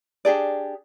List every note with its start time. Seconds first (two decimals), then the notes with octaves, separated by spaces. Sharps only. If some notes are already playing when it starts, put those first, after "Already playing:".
0.25 D4 G4 G#4 D5